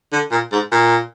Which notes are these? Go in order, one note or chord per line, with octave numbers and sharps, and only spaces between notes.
D3
A#2
G#2
A#2